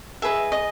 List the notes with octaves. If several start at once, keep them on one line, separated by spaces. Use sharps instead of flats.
G#4 B4 D#5 E5
D#5